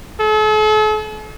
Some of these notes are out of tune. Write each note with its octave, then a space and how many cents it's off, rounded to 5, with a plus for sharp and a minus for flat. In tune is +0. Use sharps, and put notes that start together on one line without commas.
A4 -45